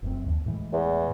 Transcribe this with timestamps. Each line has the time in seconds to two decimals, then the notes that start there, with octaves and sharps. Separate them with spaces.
0.02 F1 F#2 C4
0.23 E1 D#2
0.46 A2 E3 G#3
0.73 E2